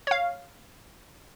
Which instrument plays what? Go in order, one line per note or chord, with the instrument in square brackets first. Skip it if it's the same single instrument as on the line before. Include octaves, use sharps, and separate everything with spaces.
[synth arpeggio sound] C#5 F5